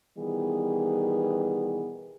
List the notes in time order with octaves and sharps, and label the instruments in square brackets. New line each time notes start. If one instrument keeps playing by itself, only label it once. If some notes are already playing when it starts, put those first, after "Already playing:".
[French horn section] B2 D#3 E3 G3 B3 G#4